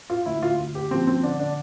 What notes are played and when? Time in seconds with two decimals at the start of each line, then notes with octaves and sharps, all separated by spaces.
0.10 F4
0.26 D2 E4
0.43 F4
0.59 D2
0.75 G4
0.91 F3 C4
1.07 C4
1.23 D3 D4
1.39 D4